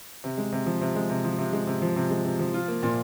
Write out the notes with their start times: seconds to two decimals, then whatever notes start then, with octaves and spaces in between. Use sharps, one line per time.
0.24 C3
0.38 G#3
0.52 C3
0.66 F3
0.81 C3
0.95 G#3
1.10 C3
1.25 F3
1.38 C3
1.53 G#3
1.67 C3
1.82 F3
1.96 C3
2.10 G#3
2.25 C3
2.39 F3
2.54 F4
2.68 A#3
2.83 A#2